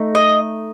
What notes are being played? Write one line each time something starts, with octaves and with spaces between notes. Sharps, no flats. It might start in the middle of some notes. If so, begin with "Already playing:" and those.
Already playing: A3 D#4
D#5